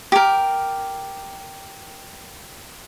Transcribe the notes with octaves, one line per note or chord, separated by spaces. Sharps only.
G4 A#4